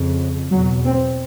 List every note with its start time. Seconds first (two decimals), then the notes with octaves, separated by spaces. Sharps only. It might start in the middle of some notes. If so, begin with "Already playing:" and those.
Already playing: F2 C#3
0.51 E2 B2 F#3
0.85 C4